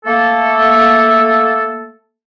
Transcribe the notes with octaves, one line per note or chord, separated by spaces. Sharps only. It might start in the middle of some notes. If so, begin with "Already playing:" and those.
A3 A#3 A4